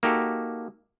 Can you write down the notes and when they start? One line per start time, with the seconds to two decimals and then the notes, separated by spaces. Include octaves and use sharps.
0.03 A#3 D#4 F#4 G4 A4